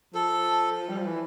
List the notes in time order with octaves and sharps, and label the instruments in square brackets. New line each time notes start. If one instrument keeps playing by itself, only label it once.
[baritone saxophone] F3 [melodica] A4
[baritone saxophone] G3
F3
E3